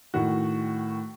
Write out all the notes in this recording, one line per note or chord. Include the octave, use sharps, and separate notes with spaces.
A2 D#3 F#4